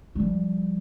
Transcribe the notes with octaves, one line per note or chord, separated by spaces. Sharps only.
F3 G3